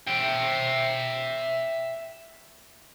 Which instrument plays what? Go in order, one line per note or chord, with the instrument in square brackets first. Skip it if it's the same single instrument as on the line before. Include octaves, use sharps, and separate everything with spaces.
[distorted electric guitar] E5 G5